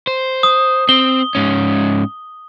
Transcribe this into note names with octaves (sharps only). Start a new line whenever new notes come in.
C5
D#6
C4 G7
G#2 C#4